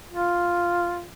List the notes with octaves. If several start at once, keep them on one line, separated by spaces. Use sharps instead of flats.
F4